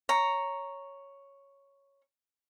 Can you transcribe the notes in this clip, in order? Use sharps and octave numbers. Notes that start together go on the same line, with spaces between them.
C#5 A#5